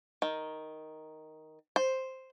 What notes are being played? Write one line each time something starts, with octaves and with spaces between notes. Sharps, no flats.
D#3
C5